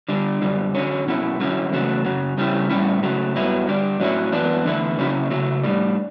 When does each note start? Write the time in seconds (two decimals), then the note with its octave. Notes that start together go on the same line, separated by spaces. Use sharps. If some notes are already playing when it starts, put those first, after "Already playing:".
0.08 D3 G3 D4
0.42 F#2 D3 G3
0.74 D3 F#3 C#4
1.07 B2 F#3 C#4 E4
1.40 D3 F#3 C#4 E4
1.72 E2 C#3 F#3 A3
2.05 F#2 C#3 F#3
2.37 C#3 G3 C#4 E4
2.69 A2 G3 C#4 E4
3.03 C#3 F#3 A3
3.35 G2 F#3 B3 E4
3.67 D3 G3 D4
4.00 A2 F#3 C#4 E4
4.32 F#2 E3 B3 D4
4.65 E2 D3 A3 E4
4.98 C#3 F#3 C#4 E4
5.31 C#3 F#3 A3
5.63 A2 G3 D4